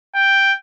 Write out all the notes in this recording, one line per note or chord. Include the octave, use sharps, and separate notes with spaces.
G5